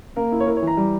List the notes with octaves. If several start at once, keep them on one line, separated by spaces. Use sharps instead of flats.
A#3 A#4
E4
C#5
E4 A#4
C#5
E3
A#5
G3